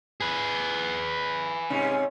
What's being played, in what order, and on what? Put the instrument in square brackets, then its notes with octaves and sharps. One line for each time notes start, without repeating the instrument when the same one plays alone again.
[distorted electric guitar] G#4 B4
[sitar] G#2 C3 C#4